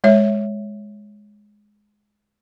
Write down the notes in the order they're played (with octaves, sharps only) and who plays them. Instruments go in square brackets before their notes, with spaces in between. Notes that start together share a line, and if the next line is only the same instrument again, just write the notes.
[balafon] G#3 C#5 E5